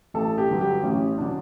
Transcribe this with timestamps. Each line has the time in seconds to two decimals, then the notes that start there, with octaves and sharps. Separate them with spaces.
0.14 A1 A4
0.38 G4
0.49 G2 D3 F#3
0.61 G4
0.83 A1 C#4
1.18 D4
1.20 D3 F#3 C#4